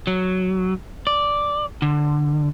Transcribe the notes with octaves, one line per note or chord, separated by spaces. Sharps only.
F#3
D5
D3